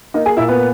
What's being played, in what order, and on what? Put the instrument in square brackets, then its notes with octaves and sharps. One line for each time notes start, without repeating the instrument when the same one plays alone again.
[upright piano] A#3 D#4 D#5
G#4 G#5
A#2 E4 E5
B3 B4